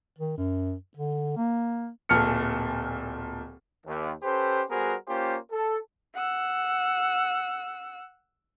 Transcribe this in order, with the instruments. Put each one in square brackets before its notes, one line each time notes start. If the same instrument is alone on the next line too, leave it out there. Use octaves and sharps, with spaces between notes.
[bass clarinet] D#3
F#2
D3
A#3
[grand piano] D1 A#2 A4 F6 C#7
[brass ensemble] D#2
C#4 G4 A4 B4 C5
G3 B3 F#4 G#4 A#4 C5
A#3 C#4 F4 G4 C5
A4
[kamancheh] F#5 E6